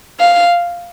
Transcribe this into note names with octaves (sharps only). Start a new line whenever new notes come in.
F5